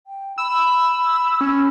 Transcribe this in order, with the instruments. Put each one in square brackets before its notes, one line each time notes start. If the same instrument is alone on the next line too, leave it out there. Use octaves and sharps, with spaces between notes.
[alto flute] G5
[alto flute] B5 [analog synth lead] E6
[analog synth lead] C#4